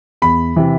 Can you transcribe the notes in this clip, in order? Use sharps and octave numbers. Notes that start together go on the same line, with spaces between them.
E2 B5
C3 E3